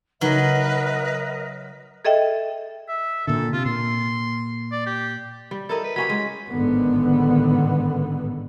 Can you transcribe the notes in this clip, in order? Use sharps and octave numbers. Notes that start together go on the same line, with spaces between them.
C#3 F#3 D#4 A#4 B4 D#5 E5
G#4 A4 D#5 E5 G5
E5
A#2 D3 A4
C3 F4
A#2 C6
D5
G4
G3
E4 A4 A#4 D#5
B4
F#3 C#4 G4 B5
G#3
A1 G#2 D3 D#3 B3